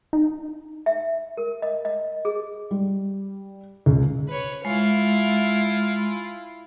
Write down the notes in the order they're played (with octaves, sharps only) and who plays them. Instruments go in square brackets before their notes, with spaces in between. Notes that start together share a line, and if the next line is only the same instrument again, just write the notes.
[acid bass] D#4
[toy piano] E5
A#4
D#5
D#5
G#4
[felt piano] G3
C#2
[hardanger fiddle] B4 C#5
[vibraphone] G#3 [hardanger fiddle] E4 F4